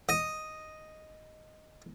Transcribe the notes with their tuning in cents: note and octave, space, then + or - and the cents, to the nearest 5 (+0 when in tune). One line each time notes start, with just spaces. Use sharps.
D#5 +0